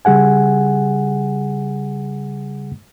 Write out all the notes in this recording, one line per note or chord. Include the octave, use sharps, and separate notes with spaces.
C#3 G3 G#4 F#5 G#5